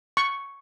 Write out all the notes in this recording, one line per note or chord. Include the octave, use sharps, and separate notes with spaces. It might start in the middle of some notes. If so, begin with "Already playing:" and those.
C#6